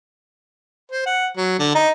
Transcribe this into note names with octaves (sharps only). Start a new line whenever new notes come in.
C5
F#5
F#3
D3
D#4